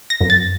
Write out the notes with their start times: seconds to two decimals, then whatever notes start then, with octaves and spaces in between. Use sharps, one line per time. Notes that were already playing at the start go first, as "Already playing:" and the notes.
0.10 A#6
0.21 F#2
0.30 A6